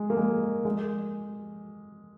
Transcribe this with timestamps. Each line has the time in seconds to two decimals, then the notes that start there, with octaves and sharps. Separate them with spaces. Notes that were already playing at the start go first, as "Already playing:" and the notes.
Already playing: G#3
0.10 A#3
0.17 G#3
0.65 G#3